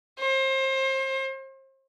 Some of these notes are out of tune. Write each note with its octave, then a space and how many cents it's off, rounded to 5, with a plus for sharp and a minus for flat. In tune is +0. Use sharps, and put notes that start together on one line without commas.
C5 +30